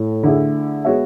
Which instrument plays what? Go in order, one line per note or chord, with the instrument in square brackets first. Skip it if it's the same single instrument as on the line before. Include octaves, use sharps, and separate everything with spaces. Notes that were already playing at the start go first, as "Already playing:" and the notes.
Already playing: [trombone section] A2
[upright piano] D3 A3 E4 G#4
G#3 B3 F#4 C#5 E5